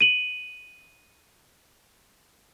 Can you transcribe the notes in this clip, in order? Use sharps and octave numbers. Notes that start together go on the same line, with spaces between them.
D#7 F#7